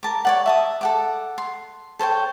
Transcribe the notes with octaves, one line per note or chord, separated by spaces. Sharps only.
A#4 A5 D6
C#5 D5 F#5
E5 A5 D#6
A4 F#5 D6
C6
A4 C5 C#5 G5